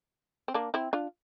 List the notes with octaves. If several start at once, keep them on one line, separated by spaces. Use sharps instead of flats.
C4
A#3 D4
C4 E4
D4 F4